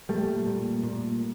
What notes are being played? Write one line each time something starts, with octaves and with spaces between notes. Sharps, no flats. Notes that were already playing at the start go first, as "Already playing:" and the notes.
A#2 G3 A3
A#2
A#2